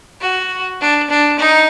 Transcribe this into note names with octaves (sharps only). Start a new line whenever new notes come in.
F#4
D4
D4
D#4